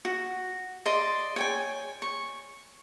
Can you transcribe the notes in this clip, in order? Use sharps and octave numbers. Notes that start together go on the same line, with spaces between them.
F#4
D5 D#5 C6
C#5 G5 G#5
C#6